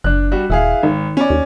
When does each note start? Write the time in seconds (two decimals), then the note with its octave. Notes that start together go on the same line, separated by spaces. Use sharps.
0.04 F#1 D4 F#6
0.32 G3 F#4
0.50 D#1 E4 G#4 F5
0.83 G#1 D#3
1.17 C#4 D5
1.30 D#2